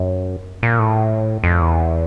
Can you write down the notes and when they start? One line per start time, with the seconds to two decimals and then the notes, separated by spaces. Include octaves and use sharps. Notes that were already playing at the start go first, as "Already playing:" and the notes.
Already playing: F#2
0.63 A#2
0.79 A2
1.44 F2
1.61 E2